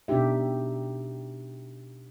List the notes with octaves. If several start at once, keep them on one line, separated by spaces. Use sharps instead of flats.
B2 D4 D#4 G4 E5